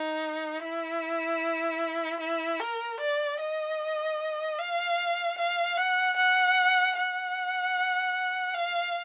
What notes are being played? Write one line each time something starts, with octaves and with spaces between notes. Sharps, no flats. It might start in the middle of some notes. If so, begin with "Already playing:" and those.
Already playing: D#4
E4
E4
A#4
D5
D#5
F5
F5
F#5
F#5
F#5
F5